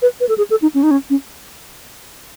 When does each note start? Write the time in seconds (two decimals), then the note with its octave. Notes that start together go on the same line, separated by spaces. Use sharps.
0.02 B4
0.20 B4
0.29 A4
0.38 G#4
0.50 A4
0.62 D#4
0.74 C#4
0.83 D#4
0.91 C#4
1.10 C#4